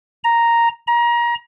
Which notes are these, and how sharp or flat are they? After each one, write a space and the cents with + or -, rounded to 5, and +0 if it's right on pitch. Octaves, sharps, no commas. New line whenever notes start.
A#5 +0
A#5 +30